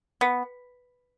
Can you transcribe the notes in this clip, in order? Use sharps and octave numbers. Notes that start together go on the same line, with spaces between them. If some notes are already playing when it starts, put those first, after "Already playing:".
B3